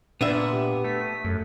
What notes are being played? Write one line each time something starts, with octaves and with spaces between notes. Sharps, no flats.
A#2 B3 D4 E5
G4
A3 B6
F#2 A3